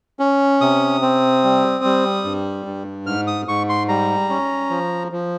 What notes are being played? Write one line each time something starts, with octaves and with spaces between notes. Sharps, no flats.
C#4
C3 D#6
C4
G3
G3
G2
G2
G#2 F6
D#6
G#2 C#6
C6
G3 A#5
C#4
F3
F3